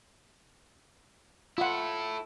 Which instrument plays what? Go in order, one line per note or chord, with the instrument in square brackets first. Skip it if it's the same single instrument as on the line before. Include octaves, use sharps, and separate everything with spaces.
[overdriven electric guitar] E4 A4 [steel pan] F4 F#5